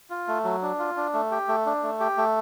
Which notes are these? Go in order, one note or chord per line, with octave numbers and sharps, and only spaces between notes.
F4
A3
F#3
D4
F4
D4
A3
G4
A3
D4
A3
G4
A3